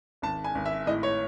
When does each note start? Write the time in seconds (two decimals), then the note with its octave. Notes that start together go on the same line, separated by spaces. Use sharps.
0.22 G#1 A5
0.44 G#5
0.55 G#1
0.66 E5
0.87 A2 D#5
1.03 C#5